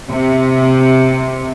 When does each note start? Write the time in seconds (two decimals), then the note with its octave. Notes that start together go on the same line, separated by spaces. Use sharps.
0.12 C3